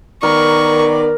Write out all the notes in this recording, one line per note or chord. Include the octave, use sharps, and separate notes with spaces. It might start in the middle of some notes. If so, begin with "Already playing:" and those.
D#3 B3 A#4 D5 C#6